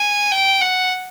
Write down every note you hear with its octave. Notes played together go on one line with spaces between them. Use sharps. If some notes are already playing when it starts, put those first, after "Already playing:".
Already playing: G#5
G5
F#5